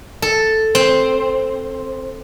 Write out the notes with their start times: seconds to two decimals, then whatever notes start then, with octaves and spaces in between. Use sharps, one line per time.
0.22 A4
0.75 C4